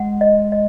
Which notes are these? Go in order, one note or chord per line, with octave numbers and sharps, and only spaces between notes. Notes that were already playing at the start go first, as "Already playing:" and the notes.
Already playing: G#3 F#5
D#5
D#5